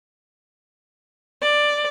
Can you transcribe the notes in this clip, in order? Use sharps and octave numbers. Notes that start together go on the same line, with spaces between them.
D5